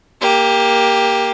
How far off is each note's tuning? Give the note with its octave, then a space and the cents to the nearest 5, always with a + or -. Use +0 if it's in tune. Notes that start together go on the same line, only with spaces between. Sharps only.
A#3 +5 G4 +15